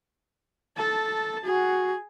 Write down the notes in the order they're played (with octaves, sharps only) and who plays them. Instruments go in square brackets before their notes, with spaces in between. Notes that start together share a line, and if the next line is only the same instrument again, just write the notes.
[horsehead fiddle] A4 A5
[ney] F#4 [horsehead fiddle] G#4